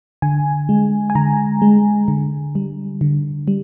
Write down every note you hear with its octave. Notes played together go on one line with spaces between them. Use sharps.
D3 G#5
G#3
G#5
D3 A#5
G#3
D3
G3
D3
G3